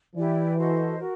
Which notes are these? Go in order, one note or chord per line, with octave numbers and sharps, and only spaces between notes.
E3 E4 G4 B4 D5
F#4 A4 C5 D#5
F#4 A#4